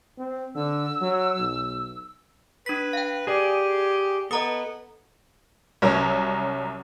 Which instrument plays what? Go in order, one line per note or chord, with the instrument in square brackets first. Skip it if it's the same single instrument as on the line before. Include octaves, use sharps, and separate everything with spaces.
[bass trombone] C4
[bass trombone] D3 [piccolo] E6
[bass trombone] F#3
B1
[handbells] D4 B6 [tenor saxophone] B4
[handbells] F5 G5
[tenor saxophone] G4 [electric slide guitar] G#4 D5
[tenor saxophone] B3 [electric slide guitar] A4 [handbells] D#5 A#5 D#6
[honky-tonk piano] C2 F#3 C#4 A#5